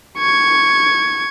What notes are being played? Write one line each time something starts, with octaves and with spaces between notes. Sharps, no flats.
C#6 G#6